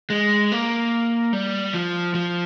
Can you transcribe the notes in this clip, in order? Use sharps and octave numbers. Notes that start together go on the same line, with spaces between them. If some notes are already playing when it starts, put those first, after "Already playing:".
G#3
A#3
G3
F3
F3